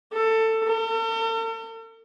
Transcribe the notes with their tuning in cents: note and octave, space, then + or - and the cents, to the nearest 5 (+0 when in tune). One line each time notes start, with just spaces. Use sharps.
A4 +20
A4 +45